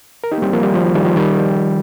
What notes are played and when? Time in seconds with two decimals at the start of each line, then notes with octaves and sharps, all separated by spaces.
0.24 A#4
0.32 D#4 G4
0.38 A#3
0.42 G3 C4
0.53 F3 A#3
0.63 D#3 G3
0.74 F3
0.85 F3
0.95 D#3 G3
1.05 F3
1.16 D#3 G3
1.36 F3